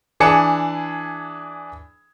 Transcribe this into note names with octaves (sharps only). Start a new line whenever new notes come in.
E3 D4 G#4 A5 C#7